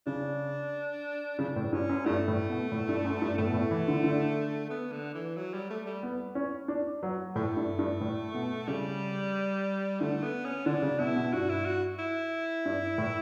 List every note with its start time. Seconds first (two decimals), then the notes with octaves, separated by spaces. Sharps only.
0.07 C#3 D4
1.39 C#3 D4
1.56 A2
1.72 G2 C#4
1.89 F#2
2.06 G2 A3
2.28 A2
2.50 B2
2.72 A2
2.89 G2
3.04 F#2
3.22 G2
3.38 A2 A3
3.47 B2
3.54 A2
3.71 E3
3.88 D3
4.04 D3
4.70 B3
4.92 D3
5.14 E3
5.36 F#3
5.54 G3
5.70 A3
5.86 G3
6.03 B3
6.35 C#4
6.68 D4
7.03 F#3
7.36 A2 A3
7.57 G2
7.79 G2
8.01 A2
8.34 B2
8.68 C#3 G3
10.00 D3 A3
10.23 B3
10.45 C#4
10.66 D3 D4
10.82 C#3
10.99 B2 E4
11.16 B2
11.33 G2 F#4
11.50 E4
11.65 F#4
11.99 E4
12.66 G2
12.98 A2